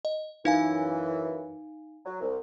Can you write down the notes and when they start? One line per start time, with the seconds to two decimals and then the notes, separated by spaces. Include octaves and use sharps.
0.05 D#5
0.45 F#2 E3 D#4 F5 G#5
2.06 F#3
2.21 C2